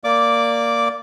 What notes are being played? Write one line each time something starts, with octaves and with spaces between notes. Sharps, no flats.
A#3 D5 D6